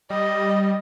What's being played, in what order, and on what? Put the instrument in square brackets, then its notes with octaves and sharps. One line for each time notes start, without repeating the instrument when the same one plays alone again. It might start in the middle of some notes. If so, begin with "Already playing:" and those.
[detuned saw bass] G3 [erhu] D#5